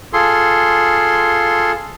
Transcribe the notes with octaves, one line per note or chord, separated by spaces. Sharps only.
F4 G#4 A4 C6